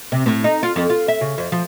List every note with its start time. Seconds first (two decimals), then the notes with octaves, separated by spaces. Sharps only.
0.12 C3
0.26 A2
0.44 D#4
0.63 F4
0.76 F2
0.90 F4
1.08 E5
1.21 C#3
1.38 F2
1.52 F3